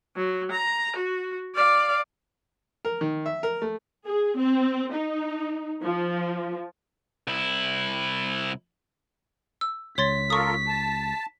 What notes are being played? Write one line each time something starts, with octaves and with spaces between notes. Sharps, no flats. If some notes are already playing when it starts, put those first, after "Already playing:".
F#3
A#5
F#4
D5 F5
A#4
D#3
E5
A#4
A3
G#4
C4
D#4
F3
C2 E4
E6
C#2 C#5 C6 A6 B6
F4 A4 A#4 C#6 D#6
A5